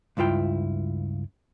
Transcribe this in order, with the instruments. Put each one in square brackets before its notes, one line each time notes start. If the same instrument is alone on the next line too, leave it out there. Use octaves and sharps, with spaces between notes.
[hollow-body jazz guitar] C#2 G2 E4 F4 G5